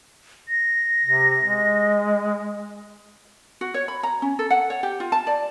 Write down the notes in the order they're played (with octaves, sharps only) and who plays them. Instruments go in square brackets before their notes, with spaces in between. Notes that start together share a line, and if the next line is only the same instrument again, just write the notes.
[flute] A#6
[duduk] C3
G#3
[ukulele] F#4
C#5
B5
A#5
C#4
A4
F#5
C#5
G4
F4
A5
D5